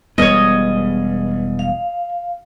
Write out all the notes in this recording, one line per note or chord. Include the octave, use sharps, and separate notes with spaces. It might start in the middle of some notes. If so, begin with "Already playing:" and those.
E1 G3 B3 C#5 D#5
F5